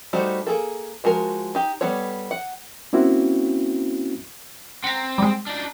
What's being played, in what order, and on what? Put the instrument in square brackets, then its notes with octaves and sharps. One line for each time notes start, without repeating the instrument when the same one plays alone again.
[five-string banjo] G3 A3 D#4 F#4 C5
A#3 G#4 A4
F3 G#3 F#4 A#4
D#4 G4
G3 B3 A4 C#5
F#5
[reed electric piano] A#3 C4 C#4 E4 F#4
[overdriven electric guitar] C4 [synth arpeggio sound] F#5 A#5
[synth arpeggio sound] G3 G#3
[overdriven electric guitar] D4 D#4